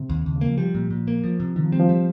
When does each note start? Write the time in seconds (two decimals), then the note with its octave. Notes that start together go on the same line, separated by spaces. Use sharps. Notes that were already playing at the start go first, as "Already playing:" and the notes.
Already playing: C3
0.10 D#2
0.26 D#2 C#3
0.36 C#3
0.41 A#3
0.47 F3
0.58 F3 G3
0.75 A#2
0.90 A#2
1.08 A#3
1.24 F3
1.40 C3
1.56 C3 D#3
1.64 F3
1.72 G3 C4
1.80 F3
1.89 G3